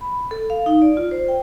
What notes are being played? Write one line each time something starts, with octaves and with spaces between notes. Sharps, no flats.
B5
A4
F5
D#4
D5
F4
C5
G5